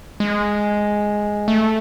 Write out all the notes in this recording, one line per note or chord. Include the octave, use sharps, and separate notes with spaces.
G#3
A3